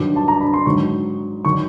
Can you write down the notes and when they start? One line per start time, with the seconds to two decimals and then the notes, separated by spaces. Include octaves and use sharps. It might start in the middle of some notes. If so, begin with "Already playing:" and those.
Already playing: G2 D#3 F#3 D6
0.16 A5
0.28 A#5
0.41 B5
0.54 C6
0.66 G#2 D#3 F#3 C#6
1.45 D#3 F#3 C#6